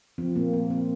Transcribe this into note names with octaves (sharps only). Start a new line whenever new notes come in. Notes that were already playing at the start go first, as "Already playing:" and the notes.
F3 C4
A#2 A#3
A#3 C4
A#3 C4